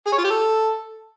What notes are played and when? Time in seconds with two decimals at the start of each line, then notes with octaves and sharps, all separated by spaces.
0.07 G#4
0.12 C#5
0.18 F4
0.24 G4
0.30 A4